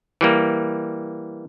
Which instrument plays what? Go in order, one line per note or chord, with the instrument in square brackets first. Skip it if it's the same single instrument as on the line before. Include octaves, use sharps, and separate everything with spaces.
[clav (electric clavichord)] E3 G3 A#3